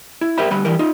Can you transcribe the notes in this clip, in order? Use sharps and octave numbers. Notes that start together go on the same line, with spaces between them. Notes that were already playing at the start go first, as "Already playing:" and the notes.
E4
G#2 G4 A#4 C5 E5 B5
D2 G3 B4 B5
E3 G3 A#4
D#4 F4